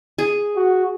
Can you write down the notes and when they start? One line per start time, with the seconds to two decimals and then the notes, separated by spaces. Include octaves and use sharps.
0.18 G#4
0.56 F#4